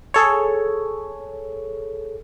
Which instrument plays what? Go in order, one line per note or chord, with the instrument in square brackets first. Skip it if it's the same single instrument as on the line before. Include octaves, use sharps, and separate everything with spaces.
[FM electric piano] G#4 A4 C#5